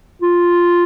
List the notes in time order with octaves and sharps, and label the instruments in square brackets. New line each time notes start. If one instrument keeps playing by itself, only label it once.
[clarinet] F4